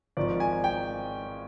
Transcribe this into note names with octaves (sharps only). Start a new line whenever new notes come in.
G#1 G#2 F3 D5
G#5
G5